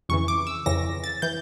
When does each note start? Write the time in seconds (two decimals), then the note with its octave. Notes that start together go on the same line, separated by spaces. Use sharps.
0.09 F2 C#3 E3 C#6
0.28 D6
0.47 E6
0.66 F2 C#3 E3 A#6
1.04 A6
1.22 E3 G6